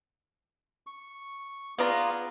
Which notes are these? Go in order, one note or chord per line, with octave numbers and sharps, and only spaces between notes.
C#6
B3 F4 G#4 D5 F5 A#5